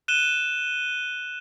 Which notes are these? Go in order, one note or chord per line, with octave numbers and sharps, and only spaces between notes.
F#6 D#7 E7 G7